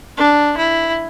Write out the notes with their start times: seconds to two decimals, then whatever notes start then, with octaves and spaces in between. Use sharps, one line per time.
0.17 D4
0.58 E4